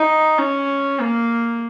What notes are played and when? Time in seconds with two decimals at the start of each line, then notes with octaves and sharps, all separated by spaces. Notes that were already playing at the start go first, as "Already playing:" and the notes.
Already playing: D#4
0.38 C#4
1.01 A#3